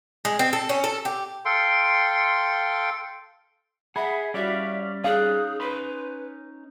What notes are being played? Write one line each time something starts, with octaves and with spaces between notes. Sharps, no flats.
G#3
C4
A4
C#4
A4
G4
A4 F5 G5 C6
G#4 E5 F#5 B5
G3 C#4 E4 F#4 C#5 D5 E5 F5
C#4 D#4 G#4 F5 F#6
B4 C#5 B5 C6